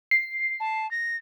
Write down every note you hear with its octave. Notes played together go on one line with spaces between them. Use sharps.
C7
A5
A#6